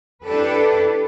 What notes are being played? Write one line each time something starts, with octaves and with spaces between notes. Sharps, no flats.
D4 E4 G4 A4 B4